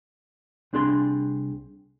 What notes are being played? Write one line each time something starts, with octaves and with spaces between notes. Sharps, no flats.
C2 C4 D4 G#4 C6